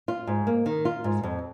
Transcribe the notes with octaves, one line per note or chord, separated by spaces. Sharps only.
F4
G#2
A#3
D#3
F4
G#2
F2